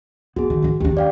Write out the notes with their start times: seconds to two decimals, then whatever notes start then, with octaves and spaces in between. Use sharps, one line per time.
0.36 B3 F#4 G#4
0.50 D#3
0.62 G#1 D#3
0.80 D#2 D4 G4
0.97 D5 F5 G5